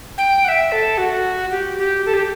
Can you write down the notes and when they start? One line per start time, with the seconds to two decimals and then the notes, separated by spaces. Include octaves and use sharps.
0.18 G5
0.45 F#5
0.48 E5
0.72 A4
0.98 F#4
1.51 G4
1.78 G4
2.06 A4
2.14 G4